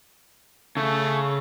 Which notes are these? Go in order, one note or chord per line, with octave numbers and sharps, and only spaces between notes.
C#3 A3